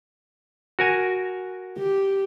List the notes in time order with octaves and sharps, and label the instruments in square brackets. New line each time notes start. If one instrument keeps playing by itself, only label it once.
[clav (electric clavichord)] F#4 A#4 G#5
[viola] G4